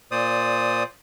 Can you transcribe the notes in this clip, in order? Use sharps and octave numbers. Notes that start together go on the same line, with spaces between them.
A#2 C5 D5 D#6